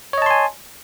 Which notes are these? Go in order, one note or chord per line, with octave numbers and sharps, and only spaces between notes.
C#5 D#5 G#5 A5 C6